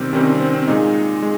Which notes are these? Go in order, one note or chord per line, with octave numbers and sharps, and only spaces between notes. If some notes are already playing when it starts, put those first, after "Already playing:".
Already playing: C3 D#3 G3 C4
C3 D#3 G3 C#4
C4
C4
C4
A#2 G#3 D#4
G#3